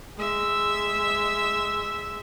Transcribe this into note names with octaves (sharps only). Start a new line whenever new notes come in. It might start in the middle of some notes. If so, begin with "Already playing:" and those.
G#3 E5